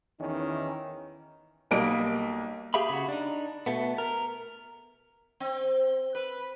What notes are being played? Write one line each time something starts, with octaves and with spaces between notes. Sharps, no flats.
E2 D#3 E3 C#4 D#4
B1 G3 A#3 D#5 D7
G4 G#4 E5 F5 B5
C#3 F#4
D4 D#4
B2 A3 B3
A#4
C4
B4